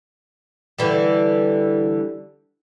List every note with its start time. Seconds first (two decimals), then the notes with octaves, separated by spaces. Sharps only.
0.79 D3 E3 G3